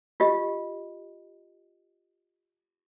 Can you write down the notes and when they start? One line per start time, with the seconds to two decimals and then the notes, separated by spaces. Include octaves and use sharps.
0.20 F4 G4 D#5